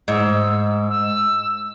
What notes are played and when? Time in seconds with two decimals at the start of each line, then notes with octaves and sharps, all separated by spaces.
0.08 G#2 E6
0.90 E6